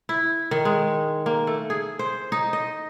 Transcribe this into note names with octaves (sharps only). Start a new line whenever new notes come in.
E4
D#3
G#3
A#3
A3
G#4
C5
D#4
D#5